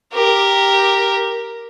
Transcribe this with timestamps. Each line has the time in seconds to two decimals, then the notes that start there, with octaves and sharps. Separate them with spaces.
0.14 G4 A#4